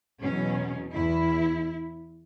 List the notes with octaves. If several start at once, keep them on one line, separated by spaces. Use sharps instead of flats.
E2 B2 F#3 C#4
E2 E4